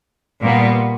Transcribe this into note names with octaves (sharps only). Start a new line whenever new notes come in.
A#2 G3 B3